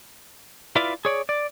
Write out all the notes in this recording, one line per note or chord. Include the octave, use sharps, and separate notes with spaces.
E4 F4 B4 D5 E5 F5
G#4 C#5 D5
D5